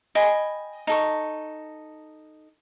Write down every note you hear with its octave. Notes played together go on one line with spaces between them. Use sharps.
D#5 G5 G#5 B5
D#4 A4 C#6